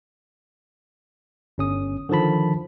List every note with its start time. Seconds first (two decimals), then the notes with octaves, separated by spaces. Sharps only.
1.58 G1 C#4 D#6
2.09 D3 D#3 F3 A5 B5